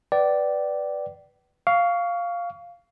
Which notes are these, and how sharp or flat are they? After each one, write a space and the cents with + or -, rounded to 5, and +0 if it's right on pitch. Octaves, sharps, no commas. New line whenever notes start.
B4 +0 D5 +0 G5 -40
F5 +0 C#6 +30